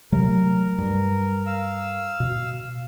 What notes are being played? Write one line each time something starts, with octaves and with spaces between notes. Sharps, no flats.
C3 F#3 A3 A#4
G2
F5 E6
B2